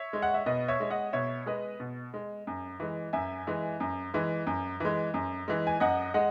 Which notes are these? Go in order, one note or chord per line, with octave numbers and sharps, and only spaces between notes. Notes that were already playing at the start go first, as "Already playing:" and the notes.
Already playing: C#5 E5
G#3
F#5
E5
B2 B4 D#5
C#5 E5
G#3
D#5 F#5
B2 C#5 E5
G#3 B4 D#5
B2
G#3
F#2
E3 G#3
F#2 E5 G#5
E3 G#3
F#2
E3 G#3
F#2
E3 G#3
F#2
E3 G#3
G#5
F#2 D#5 F#5
G#3 D#5 F#5